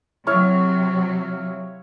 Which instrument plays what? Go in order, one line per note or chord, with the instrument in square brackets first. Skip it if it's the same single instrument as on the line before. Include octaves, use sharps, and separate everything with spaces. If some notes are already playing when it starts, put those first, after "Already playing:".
[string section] C3 F#3 [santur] E4 C#5 F5